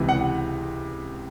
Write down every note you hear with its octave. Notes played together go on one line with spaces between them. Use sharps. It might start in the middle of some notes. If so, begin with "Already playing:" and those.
Already playing: C#2 C3 E3
F#5